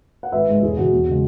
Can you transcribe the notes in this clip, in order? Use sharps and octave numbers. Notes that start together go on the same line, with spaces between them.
F#5
G#1 B4 E5
G#2 G#3
E1 E4 G#4
E2 B2 F#3 F#4
E2
C#3 G#3